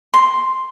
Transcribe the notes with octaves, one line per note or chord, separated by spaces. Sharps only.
C6